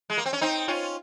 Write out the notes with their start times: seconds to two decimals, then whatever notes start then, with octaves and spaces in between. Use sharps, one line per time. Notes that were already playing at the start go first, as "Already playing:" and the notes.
0.10 G#3
0.18 A#3
0.26 C4
0.33 C#4
0.41 C4 D#4
0.68 C#4 F4